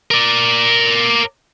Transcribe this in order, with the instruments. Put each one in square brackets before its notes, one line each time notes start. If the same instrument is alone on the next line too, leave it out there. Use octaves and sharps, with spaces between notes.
[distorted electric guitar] A#4 D5